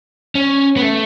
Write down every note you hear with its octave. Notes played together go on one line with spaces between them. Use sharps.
C#4
B3
A3